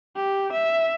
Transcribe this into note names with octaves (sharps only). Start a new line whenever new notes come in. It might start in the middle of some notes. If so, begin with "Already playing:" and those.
G4
E5